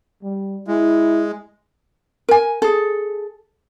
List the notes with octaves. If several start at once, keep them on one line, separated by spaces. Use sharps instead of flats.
G3
G#3 E4
A#4 G#5
G#4 A4